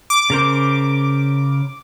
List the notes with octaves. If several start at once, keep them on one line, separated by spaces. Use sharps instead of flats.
D6
C#3 A#4 C5